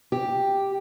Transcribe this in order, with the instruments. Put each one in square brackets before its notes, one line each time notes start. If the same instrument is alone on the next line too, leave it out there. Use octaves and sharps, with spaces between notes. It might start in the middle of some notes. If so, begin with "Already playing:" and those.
[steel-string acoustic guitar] G4